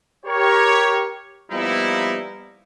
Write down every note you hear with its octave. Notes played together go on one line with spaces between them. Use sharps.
G4 A#4 C#5
F3 G3 A#3 B3 D#4 E4